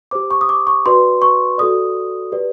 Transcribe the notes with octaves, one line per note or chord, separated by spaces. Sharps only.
G4 C5 D6
C#6
D#6
D6
C#6
F#4 B4 D5 C6
C#6
F#4 A4 D5 D#6
G4 B4 D5